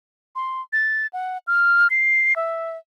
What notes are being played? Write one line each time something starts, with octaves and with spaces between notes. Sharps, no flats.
C6
A6
F#5
F6
C7
E5